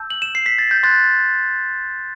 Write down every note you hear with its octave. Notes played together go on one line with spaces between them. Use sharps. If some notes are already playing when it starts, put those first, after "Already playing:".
Already playing: A5 E6 G6
F#7
E7
C7
B6
A6
G6
C6 F#6 A6